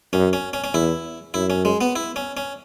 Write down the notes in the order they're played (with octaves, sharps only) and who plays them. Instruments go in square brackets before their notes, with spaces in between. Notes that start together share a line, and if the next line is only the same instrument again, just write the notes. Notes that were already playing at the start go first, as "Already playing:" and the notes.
[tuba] F#2 [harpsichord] C#4
[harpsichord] C#4
C#4
C#4
[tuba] E2 [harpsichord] E4
[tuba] F#2 [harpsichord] E4
[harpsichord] C#4
G#3
B3
E4
C#4
C#4